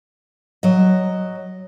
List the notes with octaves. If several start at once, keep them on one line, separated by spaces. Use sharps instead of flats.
F#3 D#5